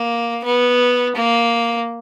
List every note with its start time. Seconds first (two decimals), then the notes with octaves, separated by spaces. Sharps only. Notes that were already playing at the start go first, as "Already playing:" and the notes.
Already playing: A#3
0.44 B3
1.15 A#3